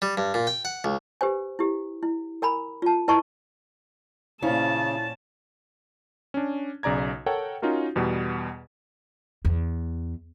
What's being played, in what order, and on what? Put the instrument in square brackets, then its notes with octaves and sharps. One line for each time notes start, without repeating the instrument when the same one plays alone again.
[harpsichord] G3
G2
A#2
G5
F#5
C#2
[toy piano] G4 B4 C5 G#5
E4 G4
E4
A#4 G#5 A#5 B5
F4 A5
E4 B4 D#5 A5 A#5 C#6
[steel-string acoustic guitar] A#2 C#4 [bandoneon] C#3 [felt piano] E4 C5 F5 [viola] A5
[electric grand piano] C#4 D4
B1 C#3 D5 A#5 G#6
A4 A#4 C#5 F#5 G5
C#4 D#4 F4 F#4 A#4
E2 B2 G3 B3
[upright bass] E2